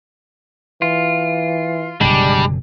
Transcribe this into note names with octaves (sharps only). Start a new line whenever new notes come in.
E3 F4
F#1 B2 D3 G3 G#3 D4